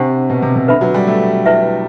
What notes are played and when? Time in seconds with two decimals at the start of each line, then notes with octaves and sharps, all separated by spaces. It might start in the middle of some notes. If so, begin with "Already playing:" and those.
Already playing: C3 D4 G4 C5 F#5
0.30 B2
0.42 C3
0.56 C3
0.68 D3 B4 E5 B5
0.81 F#3
0.94 G3
1.07 A3
1.46 E4 B4 E5